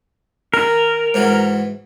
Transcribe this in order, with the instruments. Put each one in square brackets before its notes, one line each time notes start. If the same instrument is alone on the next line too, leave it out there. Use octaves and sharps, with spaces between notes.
[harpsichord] D#3 [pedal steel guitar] A#4
[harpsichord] G#2 E3 F#4